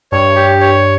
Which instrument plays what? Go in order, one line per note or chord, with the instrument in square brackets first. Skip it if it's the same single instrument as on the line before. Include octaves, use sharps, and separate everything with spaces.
[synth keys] G2 [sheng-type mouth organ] C#5
[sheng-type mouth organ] G4
C#5